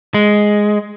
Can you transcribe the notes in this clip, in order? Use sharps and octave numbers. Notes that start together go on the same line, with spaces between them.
G#3